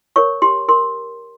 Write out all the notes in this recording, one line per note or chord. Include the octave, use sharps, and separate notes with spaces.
A#4 C#5 C#6
G4 C6
A#4 C6